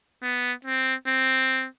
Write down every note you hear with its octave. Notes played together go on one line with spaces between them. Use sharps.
B3
C4
C4